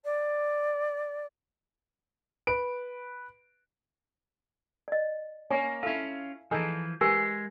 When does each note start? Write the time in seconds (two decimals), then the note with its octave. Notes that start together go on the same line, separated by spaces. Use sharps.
0.04 D5
2.47 B4 D7
4.88 D5 D#5
5.50 A#3 C#4 G#5
5.83 C#4 E4 F4 A4 F5
6.51 E3 F3 D#4 G#4 A4
7.01 E3 G#3 G4 A#4 G#5